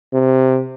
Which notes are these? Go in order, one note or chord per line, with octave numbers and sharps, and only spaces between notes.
C3